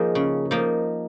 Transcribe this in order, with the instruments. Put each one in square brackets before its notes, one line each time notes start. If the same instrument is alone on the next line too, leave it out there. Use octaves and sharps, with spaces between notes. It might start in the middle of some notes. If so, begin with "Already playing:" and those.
Already playing: [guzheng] F3 A#3 D#4 [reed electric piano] G#4
[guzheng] C#3
F3 A#3 D#4